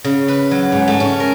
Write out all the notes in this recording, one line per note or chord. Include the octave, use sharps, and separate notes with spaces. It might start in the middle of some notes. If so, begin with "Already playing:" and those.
C#3
B4
F#3
G#2
A3
C#4
A#4